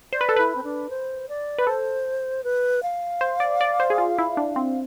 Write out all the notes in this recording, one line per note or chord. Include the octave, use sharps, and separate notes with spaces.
C5 D5
B4
A4
E4 B4
C4
D4
C5
D5
B4
A4 C5
B4
F5
C5
D5
D5
C5
G#4
F4
E4
D4
C4